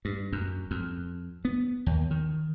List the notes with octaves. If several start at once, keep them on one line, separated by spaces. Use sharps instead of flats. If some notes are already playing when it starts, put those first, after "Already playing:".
G2
F#2
F2
B3
D#2
D#3